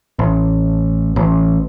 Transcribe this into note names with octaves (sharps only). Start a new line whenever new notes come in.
A1
A1